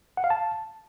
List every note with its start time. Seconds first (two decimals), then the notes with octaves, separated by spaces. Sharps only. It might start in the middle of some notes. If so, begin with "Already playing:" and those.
0.17 F#5
0.24 F5
0.30 A5